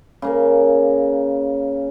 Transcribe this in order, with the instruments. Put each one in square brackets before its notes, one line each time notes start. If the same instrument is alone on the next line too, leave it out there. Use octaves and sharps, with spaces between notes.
[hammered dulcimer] C#3 A#3 A#4